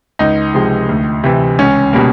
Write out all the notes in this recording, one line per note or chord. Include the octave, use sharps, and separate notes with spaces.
C#2 D#4
C3 F3 G#3
D2
C3 E3
C#2 C#4
B2 G3 A#3